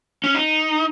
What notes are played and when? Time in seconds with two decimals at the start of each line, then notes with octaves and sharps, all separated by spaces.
0.24 C#4
0.34 D#4